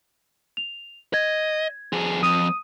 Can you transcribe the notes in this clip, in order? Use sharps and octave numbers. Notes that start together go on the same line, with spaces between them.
F7
D#5 G#6
F2 G#4
F2 D#6 D#7